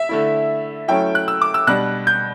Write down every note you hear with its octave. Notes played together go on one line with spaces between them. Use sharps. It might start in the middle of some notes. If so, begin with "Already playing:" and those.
Already playing: E5
D3 A3 E4
F#3 A3 C#4 E4 G5
F#6
E6
D6
E6
B2 G3 D4 F#6
G6